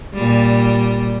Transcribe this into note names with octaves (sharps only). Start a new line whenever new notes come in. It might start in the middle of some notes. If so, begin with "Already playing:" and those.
A#2 G3